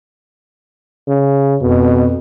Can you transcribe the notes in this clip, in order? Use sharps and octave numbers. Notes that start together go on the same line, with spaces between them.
C#3
F2 B2